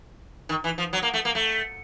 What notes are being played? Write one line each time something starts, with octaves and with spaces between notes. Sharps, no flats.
D#3
E3
F3
F#3
A#3
A3
A#3
A3